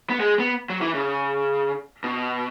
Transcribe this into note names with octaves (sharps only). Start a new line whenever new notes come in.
B3
G#3
B3
F#3
E3
C#3
B2